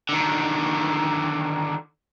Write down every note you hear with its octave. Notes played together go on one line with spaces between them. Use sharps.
D3 D#3